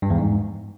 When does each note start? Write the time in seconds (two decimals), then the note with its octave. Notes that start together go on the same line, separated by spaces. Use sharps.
0.02 G2
0.10 E2
0.18 G#2